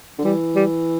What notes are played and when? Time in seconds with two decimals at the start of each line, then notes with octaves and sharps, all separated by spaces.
0.18 D3
0.24 E3 G3
0.55 G3